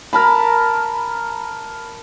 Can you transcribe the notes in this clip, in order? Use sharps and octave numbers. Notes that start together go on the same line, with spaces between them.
A#4 A5 B5